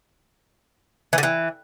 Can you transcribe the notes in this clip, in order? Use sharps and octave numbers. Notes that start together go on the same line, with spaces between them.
E3
D3
E3